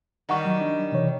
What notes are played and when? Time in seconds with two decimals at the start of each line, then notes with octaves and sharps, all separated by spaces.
0.29 D#3 G3 D#5 F#5 C#6
0.45 F#3
0.61 D4
0.92 C3 E3 C#5